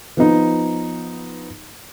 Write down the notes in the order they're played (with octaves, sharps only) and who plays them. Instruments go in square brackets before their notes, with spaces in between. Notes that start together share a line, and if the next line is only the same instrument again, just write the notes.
[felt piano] F3 B3 D#4